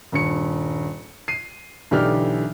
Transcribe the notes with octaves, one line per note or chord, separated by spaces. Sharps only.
D#1 G2 C#7
C7 D#7
B1 D3 E3 G4 D5 F6